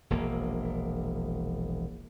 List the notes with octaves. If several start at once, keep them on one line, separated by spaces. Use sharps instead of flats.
E1 A#1 A#3